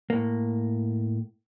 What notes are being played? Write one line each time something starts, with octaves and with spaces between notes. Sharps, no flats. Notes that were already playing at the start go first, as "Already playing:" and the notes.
A2 A#3